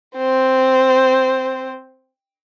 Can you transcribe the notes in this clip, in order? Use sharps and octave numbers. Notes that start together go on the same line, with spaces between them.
C4 C5